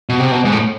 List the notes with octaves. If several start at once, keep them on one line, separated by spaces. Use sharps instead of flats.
B2
C3
B2
G#2
A2